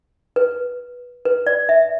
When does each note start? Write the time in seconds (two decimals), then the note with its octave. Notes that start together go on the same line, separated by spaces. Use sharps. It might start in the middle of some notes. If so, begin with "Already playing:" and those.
0.36 B4
1.25 B4
1.47 D5
1.69 E5